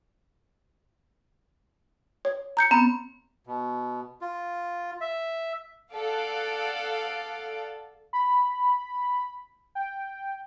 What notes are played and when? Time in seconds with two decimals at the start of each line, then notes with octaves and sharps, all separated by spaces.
2.25 C#5
2.57 A#5 G6 C#7
2.71 B3 C4 A#5
3.47 B2
4.21 F4
5.01 E5
5.93 A4 D5 F5 F#5
8.13 B5
9.75 G5